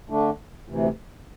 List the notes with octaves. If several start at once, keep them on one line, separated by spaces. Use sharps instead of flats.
D3 A3 D4
D2 C3 E3